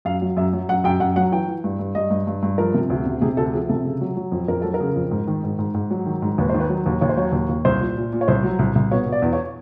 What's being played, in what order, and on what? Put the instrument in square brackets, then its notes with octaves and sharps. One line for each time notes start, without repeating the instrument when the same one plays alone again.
[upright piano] F#2 F5
F#3
F#2 E5
F#3
F#2 F#5
F#2 G5
F#2 F#5
F#3 F#5
E3 G5
E3
G2
G2
G2 D#5
G2
G2
G2
F3 A#4
C3
D2
C3
C3 G#4
D2 A4
F3 G#4
C3 A4
C#3
F#3
F#3
F2
F2 A#4
F#3 A4
A#4
C#3
F2
G#2
D#3
G#2
G#2
G#2
F#3
D#3
G#2
D#2 B4
D#3 C5
B4
F#3
D#2
D#2 C#5
C5
F#3 C#5
D#2
D#2
C2 C5
A#2
A#2
A#2
C#5
C2 C5
F#3
C2
C2
B2 C#5
B2
D5
E2
C#5